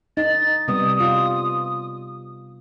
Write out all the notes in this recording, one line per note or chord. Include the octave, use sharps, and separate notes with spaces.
D#4 A6
C3 G3 B3 D#6
F4